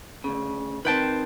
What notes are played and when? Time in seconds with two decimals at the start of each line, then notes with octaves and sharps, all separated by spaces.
0.24 D2 C#3
0.85 D#3 C4 B4 G5 A5